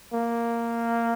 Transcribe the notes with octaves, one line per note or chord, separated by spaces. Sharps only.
A#3